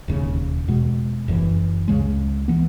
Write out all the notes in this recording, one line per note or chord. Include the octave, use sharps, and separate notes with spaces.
E1 D#2 C#3
E2 B2 G#3
F#1 F#2 E3
C#2 C#3 G#3
E3 B3